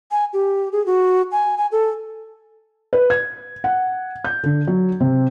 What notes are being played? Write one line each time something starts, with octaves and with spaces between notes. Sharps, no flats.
G#5
G4
G#4
F#4
G#5
G#5
A4
B4
G#6
F#5
G6
D3
F#3
C3